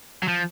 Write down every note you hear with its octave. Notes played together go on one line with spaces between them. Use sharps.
F#3
F3